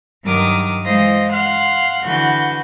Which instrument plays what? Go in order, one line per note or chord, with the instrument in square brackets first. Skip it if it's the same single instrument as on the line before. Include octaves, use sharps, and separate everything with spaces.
[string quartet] G2 D#3 F#3 A#4 D6 D#6
E3 G#3 C5 D#5 F5 A#6
F5 F#5 C6 F6
D3 E3 F#4 B4 G6